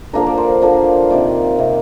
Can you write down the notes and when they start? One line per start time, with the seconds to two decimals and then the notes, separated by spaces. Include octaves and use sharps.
0.13 D3 F3 A#3 D4 A#4
0.26 D5
0.38 C5
0.62 D3 F3 A#3 D4
1.10 C3 D#3 A#3 D5
1.59 C3 D#3 A#3